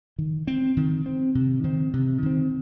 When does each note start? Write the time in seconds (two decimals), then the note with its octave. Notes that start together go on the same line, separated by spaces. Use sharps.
0.19 D#3
0.47 C4
0.77 D#3
1.06 C4
1.35 C3
1.64 D#3 C4
1.93 C3
2.23 D#3 C4